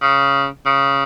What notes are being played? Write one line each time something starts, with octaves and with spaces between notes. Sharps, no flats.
C#3
C#3